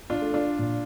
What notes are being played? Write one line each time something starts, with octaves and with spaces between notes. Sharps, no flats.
D4 F4
A3
D4 F4
A#2